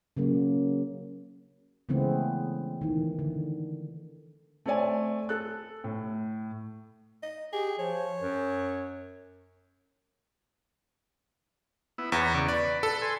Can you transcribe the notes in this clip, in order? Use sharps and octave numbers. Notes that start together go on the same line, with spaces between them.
C#3 F#3 A#3
C#3 E3 G#3 A3 B3 C4
D#3 E3
D3
A3 C4 C#5 D5 G#5
A4 F#6
A2
D#5
G4 G#4
F3 C#5
F#2
B3 E4
E2 B4 C#5 A#5
C#3 D5 C#6
B4 D5
A4
G#5 C6